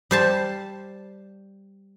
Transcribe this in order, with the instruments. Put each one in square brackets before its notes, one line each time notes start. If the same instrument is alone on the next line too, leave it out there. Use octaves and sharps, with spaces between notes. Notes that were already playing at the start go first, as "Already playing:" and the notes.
[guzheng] G3 C5 A5